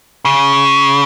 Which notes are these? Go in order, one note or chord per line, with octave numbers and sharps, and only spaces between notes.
C#3